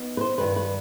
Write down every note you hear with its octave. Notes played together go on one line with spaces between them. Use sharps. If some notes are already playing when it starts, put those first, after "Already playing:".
Already playing: B3 D#4
B4
C5
G2 D#3 G3 B4
B4